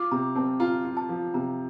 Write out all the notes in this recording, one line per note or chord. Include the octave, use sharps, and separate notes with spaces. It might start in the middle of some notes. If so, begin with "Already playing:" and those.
Already playing: F4 D6
C3 A#5
C4 A5
F4 A#5
F4
A5
F3
C3 A#5